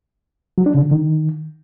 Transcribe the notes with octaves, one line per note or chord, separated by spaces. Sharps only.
F#3
D4
C#3
D3
D#3